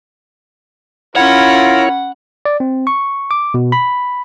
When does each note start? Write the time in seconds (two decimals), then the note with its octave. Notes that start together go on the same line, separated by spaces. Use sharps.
1.16 C#4 E4 F4 A#4 C#5 F#5 B5
2.45 D5
2.60 C4
2.87 C#6
3.31 D6
3.54 B2
3.72 B5